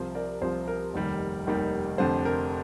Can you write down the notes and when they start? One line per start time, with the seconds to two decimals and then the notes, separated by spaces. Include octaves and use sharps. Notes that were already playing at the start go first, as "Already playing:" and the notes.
Already playing: C2 C3 F3 C5
0.15 A#4 D5
0.41 C2 C3 F3 C5
0.68 A#4
0.94 F1 D#2 D#3 G3
1.46 F1 D#2 D#3 G3
1.98 F1 F2 D3 C5
2.25 A#4